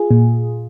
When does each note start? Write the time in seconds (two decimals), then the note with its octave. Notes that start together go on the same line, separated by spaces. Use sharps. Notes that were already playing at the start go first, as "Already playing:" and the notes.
Already playing: F4 G#4
0.11 A#2